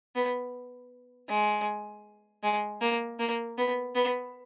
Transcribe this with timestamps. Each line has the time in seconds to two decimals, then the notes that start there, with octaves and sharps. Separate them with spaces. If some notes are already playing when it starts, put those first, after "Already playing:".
0.16 B3
1.29 G#3
2.43 G#3
2.81 A#3
3.19 A#3
3.58 B3
3.95 B3